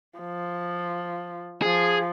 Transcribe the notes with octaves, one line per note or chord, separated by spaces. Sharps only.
F3
F3 G#4